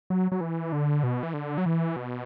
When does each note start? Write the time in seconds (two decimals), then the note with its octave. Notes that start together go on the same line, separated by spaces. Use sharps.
0.10 F#3
0.32 F#3
0.41 E3
0.72 D3
1.03 B2
1.23 E3
1.34 D3
1.58 F#3
1.66 E3
1.96 B2